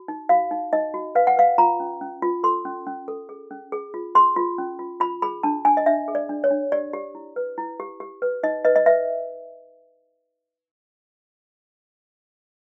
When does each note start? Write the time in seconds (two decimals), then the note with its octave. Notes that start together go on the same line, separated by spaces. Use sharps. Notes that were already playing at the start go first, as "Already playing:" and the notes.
Already playing: F#4
0.08 D#4
0.29 F#4 F5
0.51 D#4
0.73 D#4 D#5
0.94 F#4
1.15 B4 F5
1.27 F#5
1.37 B4 F5
1.58 F4 A#5
1.80 C#4
2.01 C#4
2.22 F4
2.43 A4 C6
2.65 C#4
2.87 C#4
3.08 A4
3.29 G#4
3.51 C#4
3.72 G#4
3.94 F4
4.15 G#4 C6
4.36 F4
4.58 C#4
4.79 F4
5.00 F4 B5
5.22 G#4 B5
5.43 D4 A5
5.65 D4 G#5
5.77 D#5
5.86 D4 E5
6.08 G#4
6.15 D5
6.29 D4
6.44 C#5
6.51 D4
6.72 G4 D5
6.93 G4
7.15 E4
7.36 B4
7.58 E4
7.80 G4
8.00 G4
8.22 B4
8.43 D#4 D#5
8.65 B4 D#5
8.76 D#5
8.86 B4 E5